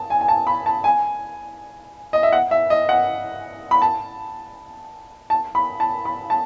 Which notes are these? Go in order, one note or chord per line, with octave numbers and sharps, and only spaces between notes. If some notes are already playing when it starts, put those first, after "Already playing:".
Already playing: A5
G#5
G#5
A5
B5
A5
G#5
D#5
E5
F#5
E5
D#5
F#5
B5
A5
A5
B5
A5
B5
A5